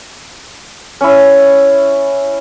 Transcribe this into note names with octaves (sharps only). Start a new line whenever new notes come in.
C#4 E4